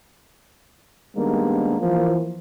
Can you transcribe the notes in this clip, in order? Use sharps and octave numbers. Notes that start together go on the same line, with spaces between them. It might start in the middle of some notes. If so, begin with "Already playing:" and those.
D#3 G3 G#3 A#3 B3 D4
E3 F3 A#3